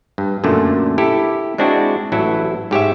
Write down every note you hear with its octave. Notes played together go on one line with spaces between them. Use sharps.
G2
F#2 A#2 D3 A3
E4 G4 A4
G#3 C4 D4 E4 F#4
A1 F#3 E4 A4
G#2 G4 C#5 E5